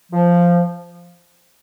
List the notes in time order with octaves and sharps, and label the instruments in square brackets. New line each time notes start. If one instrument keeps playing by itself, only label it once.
[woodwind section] F3